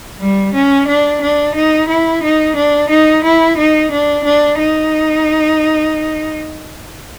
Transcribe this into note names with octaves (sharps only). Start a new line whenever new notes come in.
G3
C#4
D4
D4
D#4
E4
D#4
D4
D#4
E4
D#4
D4
D4
D#4